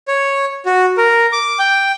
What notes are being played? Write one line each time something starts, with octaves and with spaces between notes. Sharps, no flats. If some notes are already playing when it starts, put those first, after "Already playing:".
C#5
F#4
A#4
D6
G5